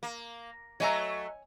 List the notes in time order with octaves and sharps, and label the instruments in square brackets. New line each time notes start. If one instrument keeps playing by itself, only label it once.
[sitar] A#3
[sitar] F#3 A3 [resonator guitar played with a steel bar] C#5 G#5 A#5 [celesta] D#5 E6